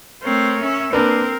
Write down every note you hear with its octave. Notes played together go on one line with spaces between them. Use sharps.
A3 C4 A#4 C#5
C#4 E5
A#3 C4 D4 A#4 B4